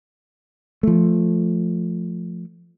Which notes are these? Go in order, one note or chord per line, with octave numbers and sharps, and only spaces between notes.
F3 A3